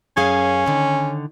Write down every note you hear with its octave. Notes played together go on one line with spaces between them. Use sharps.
F#2 C#4 G#4 F5
D3 D#3